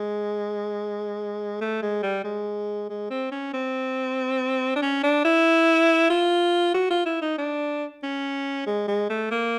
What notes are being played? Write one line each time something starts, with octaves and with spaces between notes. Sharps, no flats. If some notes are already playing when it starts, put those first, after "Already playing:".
Already playing: G#3
A3
G#3
G3
G#3
G#3
C4
C#4
C4
D4
C#4
D4
E4
F4
F#4
F4
E4
D#4
D4
C#4
G#3
G#3
A3
A#3